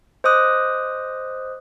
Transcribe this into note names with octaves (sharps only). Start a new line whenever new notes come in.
C5 D#5 D6 D#6 F#6